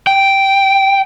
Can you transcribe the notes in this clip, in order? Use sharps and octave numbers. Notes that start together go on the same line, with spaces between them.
G5